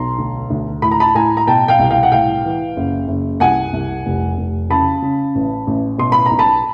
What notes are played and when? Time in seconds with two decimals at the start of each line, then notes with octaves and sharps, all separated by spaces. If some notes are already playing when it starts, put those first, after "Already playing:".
Already playing: B1 A#5 C6
0.18 D2
0.50 D2
0.82 A2 B5
0.91 A#5
1.00 A5 B5
1.14 A2 G#5 A#5
1.37 A#5
1.47 B2 G5 A5
1.68 F5 G5
1.79 C2
1.91 F5 G5
2.03 F#5
2.12 A2 F5 G5
2.44 E3
2.77 F#1
3.08 F#1
3.40 C2 F#5 G#5
3.73 C2
4.06 F1
4.37 F1
4.70 C#3 A5 B5
5.02 C#3
5.35 A1
5.67 A1
5.98 B2 C6
6.12 B5
6.26 B1 A#5
6.39 A5 B5